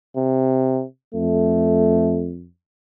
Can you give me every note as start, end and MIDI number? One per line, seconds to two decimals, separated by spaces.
0.16 0.84 48
1.14 2.47 41
1.14 2.31 57